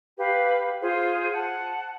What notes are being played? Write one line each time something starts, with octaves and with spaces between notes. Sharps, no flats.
G4 B4 F5
F4 G#4 C5
F#5 A5